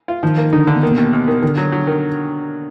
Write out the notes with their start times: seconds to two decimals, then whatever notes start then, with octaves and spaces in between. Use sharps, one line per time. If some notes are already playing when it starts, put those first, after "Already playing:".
0.08 F4
0.23 D#3 F3 D#4
0.37 A#3
0.53 D3 D4 D#4
0.67 D3 D4
0.75 B3
0.83 D#3 A#3
0.90 B2 B3
0.97 D#2
1.13 D#2
1.28 D#3
1.42 D3 D#3 D4
1.58 F#3
1.72 F#3
1.87 D#3